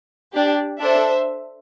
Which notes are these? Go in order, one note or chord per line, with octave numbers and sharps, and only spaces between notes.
D4 G4
D4 A4 C5 E5